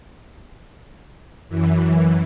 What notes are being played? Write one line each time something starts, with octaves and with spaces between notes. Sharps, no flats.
F#2 E3